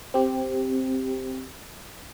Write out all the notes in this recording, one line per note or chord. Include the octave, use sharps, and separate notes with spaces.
C4 G4